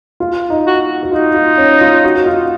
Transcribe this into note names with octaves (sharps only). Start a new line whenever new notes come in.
F4
D#4
F#4
F#4
D#4 F4
F4
C#4
F4
F#4
F#4
F4